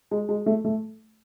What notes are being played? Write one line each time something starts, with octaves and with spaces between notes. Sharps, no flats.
G#3
G#3
A3
A3